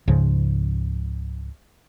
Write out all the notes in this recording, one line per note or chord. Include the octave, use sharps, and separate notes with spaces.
C#2 G#2 C#3 F3